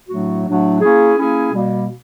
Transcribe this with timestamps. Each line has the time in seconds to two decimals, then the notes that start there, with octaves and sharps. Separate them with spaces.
0.09 A2 F#3 A3 D4 F#4
0.45 A2 F#3 A3 D4 F#4
0.81 A#3 C#4 E4 G#4
1.16 A#3 C#4 E4 G#4
1.52 B2 G3 A#3